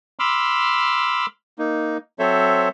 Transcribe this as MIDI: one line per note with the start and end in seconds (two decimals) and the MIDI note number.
0.19 1.26 83
0.19 1.26 84
0.19 1.26 86
0.19 1.26 88
0.19 1.26 89
1.59 1.97 58
1.59 1.97 63
2.19 2.69 54
2.19 2.69 60
2.19 2.69 69
2.19 2.69 72
2.19 2.69 73
2.19 2.69 76